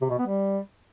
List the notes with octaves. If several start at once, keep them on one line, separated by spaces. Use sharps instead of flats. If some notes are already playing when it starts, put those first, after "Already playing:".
C3
B2
B3
G3